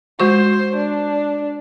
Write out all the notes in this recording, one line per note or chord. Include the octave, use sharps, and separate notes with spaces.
G#3 F#4 C5 C#6
D4